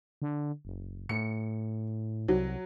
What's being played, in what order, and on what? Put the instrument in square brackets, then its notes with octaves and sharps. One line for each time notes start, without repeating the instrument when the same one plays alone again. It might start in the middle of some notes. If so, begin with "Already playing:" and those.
[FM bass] D3
F#1
[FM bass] A2 [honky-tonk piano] C#7
[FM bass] C2 [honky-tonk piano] F#3